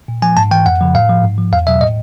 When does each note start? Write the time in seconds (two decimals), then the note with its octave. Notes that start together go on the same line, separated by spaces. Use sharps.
0.08 A#2
0.22 F3 G#5
0.37 G#2 A5
0.51 E3 G5
0.66 F2 F#5
0.81 C#3 F3
0.95 A2 F5
1.09 F3
1.24 G#2
1.38 F3
1.52 E2 F5
1.67 B2 F#3 E5
1.81 A2 D#5